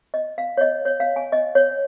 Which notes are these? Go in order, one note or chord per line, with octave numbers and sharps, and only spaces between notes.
D#5
F5
C#5
D#5
C#5
F5
G#5
D#5
C#5